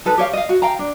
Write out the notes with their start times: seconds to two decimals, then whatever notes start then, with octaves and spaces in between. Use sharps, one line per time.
0.05 D#4 A4 B4
0.17 G4 C#5 F5
0.33 D#5 F5
0.49 F#4
0.62 F5 G5 A#5
0.79 D4